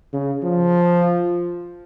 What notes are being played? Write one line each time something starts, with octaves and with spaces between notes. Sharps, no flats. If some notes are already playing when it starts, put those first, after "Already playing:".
C#3
F3